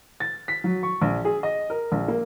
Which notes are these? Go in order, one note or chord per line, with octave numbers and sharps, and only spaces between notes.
A6
B6
F#3
C#6
A#1
G#4
D#5
A#4
A#1
A#3